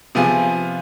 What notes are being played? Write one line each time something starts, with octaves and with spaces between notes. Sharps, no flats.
C3 F3 B3 F4 G#4